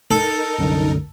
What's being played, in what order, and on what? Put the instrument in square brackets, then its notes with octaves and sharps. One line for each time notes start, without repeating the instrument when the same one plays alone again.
[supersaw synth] D#4 A#4 [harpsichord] A4
[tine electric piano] C2 F#2 D3